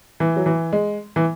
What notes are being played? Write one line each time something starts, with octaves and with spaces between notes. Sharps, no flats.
E3
F#3
E3
G#3
E3